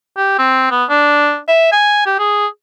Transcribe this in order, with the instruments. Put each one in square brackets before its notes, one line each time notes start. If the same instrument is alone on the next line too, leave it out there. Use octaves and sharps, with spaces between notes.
[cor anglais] G4
C4
B3
D4
E5
G#5
G4
G#4